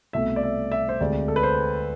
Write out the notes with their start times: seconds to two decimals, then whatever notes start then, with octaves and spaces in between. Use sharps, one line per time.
0.13 C2 B2 A3 E5
0.36 D5
0.43 E5
0.72 E5
0.89 C5
1.00 D2 C3 G#3 D5
1.28 A4
1.36 B4
1.43 C5